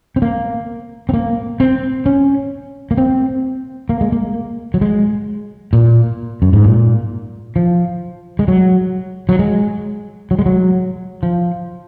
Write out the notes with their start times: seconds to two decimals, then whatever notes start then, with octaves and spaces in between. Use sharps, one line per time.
0.16 C4
0.22 A#3
1.09 C4
1.14 A#3
1.60 C4
2.06 C#4
2.91 A#3
2.97 C4
3.89 A#3
4.01 G#3
4.12 A#3
4.74 F#3
4.81 G#3
5.73 A#2
6.42 F#2
6.53 G#2
6.64 A#2
7.56 F3
8.39 G#3
8.48 F#3
9.29 F#3
9.39 G#3
10.31 F#3
10.39 G#3
10.46 F#3
11.23 F3